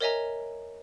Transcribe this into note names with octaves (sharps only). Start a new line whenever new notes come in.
A#4 C#5 D#5 E5 G#5 A#5